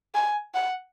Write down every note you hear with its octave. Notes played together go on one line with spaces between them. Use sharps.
G#5
F#5